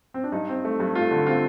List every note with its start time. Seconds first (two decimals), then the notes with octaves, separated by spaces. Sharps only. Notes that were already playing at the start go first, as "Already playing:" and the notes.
0.14 C4
0.24 D4
0.32 G2 D#4
0.49 C4
0.65 A3
0.80 G2
0.95 A3 F4
1.11 D3
1.26 C4 F4